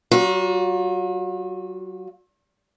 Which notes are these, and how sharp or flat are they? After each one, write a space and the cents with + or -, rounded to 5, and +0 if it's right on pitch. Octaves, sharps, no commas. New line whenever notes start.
F#3 +30 F#4 -45